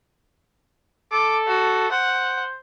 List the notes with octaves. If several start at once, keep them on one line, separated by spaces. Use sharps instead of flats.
A4 D6
F#4
C5 F#5